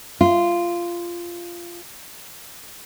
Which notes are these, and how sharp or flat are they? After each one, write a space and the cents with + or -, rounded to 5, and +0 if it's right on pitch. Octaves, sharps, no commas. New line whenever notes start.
F4 -10